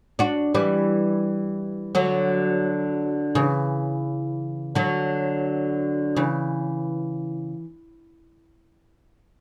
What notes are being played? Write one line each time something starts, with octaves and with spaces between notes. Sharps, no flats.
D4 F#4
E3 G3
D3 F#3
C#3 E3
D3 F#3
C#3 E3